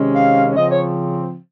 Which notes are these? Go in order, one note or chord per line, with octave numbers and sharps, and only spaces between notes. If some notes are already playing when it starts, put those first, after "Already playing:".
Already playing: C3 D#3 G#3 C#4
F5
C#3 F3 C4 D#5
C#5